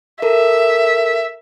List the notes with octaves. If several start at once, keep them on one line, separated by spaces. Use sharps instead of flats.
A4 A#4 E5